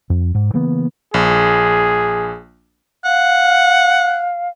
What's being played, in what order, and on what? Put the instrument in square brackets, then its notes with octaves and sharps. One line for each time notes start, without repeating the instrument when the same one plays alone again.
[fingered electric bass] F2
G#2
C#3 E3 A#3 B3
[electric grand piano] A#1 [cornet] G#4
[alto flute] F5 [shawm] F#5